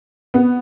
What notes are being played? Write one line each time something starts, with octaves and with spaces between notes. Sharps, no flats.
B3